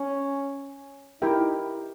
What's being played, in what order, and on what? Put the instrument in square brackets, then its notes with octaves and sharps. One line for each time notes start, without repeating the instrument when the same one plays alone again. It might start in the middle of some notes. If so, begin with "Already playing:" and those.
Already playing: [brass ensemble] C#4
[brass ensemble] D#4 [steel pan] E4 G4 A#4 E5 G5